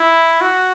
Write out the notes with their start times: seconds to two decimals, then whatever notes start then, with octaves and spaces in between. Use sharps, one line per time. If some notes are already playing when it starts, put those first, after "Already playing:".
Already playing: E4
0.41 F#4